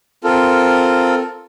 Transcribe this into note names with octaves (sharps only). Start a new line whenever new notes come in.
C4 F4 A4 A#4